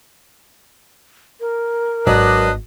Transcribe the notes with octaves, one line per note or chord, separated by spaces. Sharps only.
A#4
G#1 F#3 D4 B4 D5 D#5